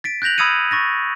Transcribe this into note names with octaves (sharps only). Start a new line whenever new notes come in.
A6 B6 D7
F#6 G6 A#6 F7 F#7
B5 D#6 E6 G#6 C#7 D#7
C#6 A6 A#6